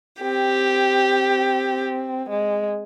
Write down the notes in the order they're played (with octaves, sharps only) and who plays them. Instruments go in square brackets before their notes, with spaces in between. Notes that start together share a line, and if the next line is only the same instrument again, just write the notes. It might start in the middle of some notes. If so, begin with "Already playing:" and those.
[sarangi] C4 [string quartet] G4
[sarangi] G#3